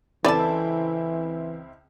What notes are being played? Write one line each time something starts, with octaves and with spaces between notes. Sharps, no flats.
C#2 E3 C4 E4 A4 B4 D5 A5